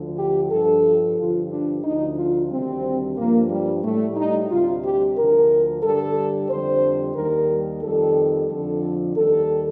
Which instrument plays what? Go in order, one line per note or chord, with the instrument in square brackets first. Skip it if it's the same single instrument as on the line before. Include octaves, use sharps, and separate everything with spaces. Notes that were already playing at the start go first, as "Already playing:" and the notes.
Already playing: [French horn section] D2 D3 F3
G4
G2 F3 A4
G2 D3 F3 F4
D4
D2 D3 F3 D#4
F4
D2 C3 D#3 G3 C4
G2 F3 A#3
G3
A2 G3 A3
D#4
D2 C3 G3 F4
G4
D2 D3 F3 A#4
G2 D3 G3 A4
F2 D3 G3 C5
D#2 D#3 G3 A#4
F2 D#3 G3 A4
F2 D3 F3 A4
D#2 D#3 G3 A4